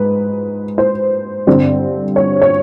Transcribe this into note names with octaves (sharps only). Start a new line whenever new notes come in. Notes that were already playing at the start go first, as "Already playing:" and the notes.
Already playing: G#2 B4
C5
G2 D3 G3 C4
C#5
C#5